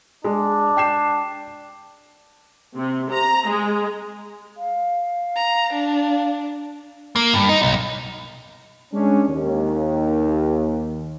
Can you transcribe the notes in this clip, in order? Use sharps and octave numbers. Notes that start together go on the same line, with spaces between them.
G#3 D4
G5 C7 E7
C3
A#5
G#3
F5
A#5
D4
A#3
G2
D#4
B1
G#3 C#4 D4
D#2